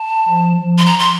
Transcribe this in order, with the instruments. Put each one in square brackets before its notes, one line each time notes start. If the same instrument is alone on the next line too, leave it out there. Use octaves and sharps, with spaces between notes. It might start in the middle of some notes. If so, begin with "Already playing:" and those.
Already playing: [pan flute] A5
[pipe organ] F3
F3
[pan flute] C6
A#5
C6